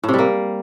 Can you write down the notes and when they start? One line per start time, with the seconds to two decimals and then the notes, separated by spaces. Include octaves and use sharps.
0.04 A2
0.09 C3
0.14 G3
0.19 A#3